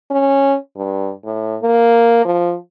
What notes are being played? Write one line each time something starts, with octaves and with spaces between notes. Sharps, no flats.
C#4
G2
A2
A#3
F3